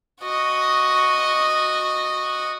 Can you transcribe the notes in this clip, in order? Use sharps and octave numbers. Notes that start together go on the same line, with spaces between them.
F#4 D#5